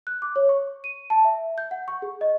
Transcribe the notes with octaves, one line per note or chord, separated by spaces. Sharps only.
F#6
D6
C#5
C#6
D#7
A5
E5
G6
F#5
C#6
G#4
D#5